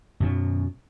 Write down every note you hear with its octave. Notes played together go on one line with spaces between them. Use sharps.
F#2 B2 F#3